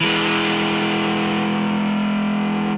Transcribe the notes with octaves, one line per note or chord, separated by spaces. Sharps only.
E3 G#3